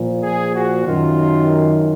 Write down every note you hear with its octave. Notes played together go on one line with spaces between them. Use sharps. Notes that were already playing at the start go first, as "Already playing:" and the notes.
Already playing: A#2 F3
G#4
F#4
F#2 D#3 F4